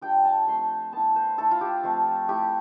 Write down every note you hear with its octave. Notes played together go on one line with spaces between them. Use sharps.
G3 D4 F4 G5
A5
F3 A3 C4 C6
B3 E4 A5
C5
A3 E4 A4
F4
G4
F3 A3 C4
A3 E4 G4